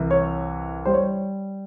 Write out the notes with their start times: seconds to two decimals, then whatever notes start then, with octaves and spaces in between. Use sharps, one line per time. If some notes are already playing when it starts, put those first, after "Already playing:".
Already playing: C2 E3
0.11 C#5
0.85 G3 C5
0.94 C#5